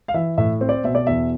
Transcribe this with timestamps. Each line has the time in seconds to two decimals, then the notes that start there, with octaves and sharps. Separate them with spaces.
0.08 F5
0.14 E3 E5
0.38 A2 E5
0.61 C4
0.69 D5
0.84 B2 E5
0.95 D5
1.07 E2 E5